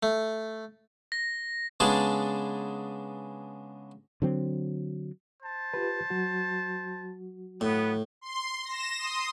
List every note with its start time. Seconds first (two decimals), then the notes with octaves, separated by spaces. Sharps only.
0.03 A3
1.12 A#6
1.80 C#3 G#3 B3 D4 G#4 A5
4.22 D3 F#3 C4
5.43 C5 A5
5.74 F4 G4 B4
6.10 F#3 F#4
7.61 A2 B3
8.21 C6
8.65 A#6 E7
8.98 C6 D#6